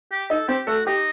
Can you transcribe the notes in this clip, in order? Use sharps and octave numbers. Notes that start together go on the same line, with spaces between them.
G4
D#4 A4 D#5
C4 G4 C5
A3 F#4 A4
D#4 G4